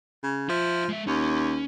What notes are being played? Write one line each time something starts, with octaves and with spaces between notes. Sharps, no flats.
C#3
F3 F4 E5
G#3 E5
D#2 C#4